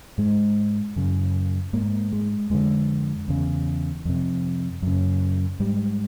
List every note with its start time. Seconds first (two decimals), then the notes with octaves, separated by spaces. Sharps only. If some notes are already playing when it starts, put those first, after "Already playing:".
0.18 G#2 G#3
0.96 F#2 C#3
1.73 G#2 A#3
2.12 G#3
2.50 F2 D3 G#3
3.28 E2 C#3
4.05 F2 C3
4.82 F#2 C#3
5.60 G#2 G3